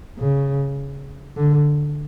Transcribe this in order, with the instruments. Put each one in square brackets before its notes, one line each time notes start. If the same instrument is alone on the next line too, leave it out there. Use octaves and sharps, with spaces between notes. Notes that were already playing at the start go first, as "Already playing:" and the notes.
[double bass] C#3
D3